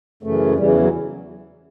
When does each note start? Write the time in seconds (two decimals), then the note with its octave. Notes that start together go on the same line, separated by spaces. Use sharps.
0.23 F#2 C#3 E3 A3
0.56 E2 C#3 E3 G3
0.68 F#3
0.79 F#3